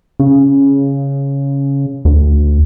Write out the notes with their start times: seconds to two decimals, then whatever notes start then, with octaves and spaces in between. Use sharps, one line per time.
0.20 C#3
2.05 D2